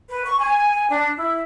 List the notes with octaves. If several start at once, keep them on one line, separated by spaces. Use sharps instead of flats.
B4
C#6
G#5
D4
E4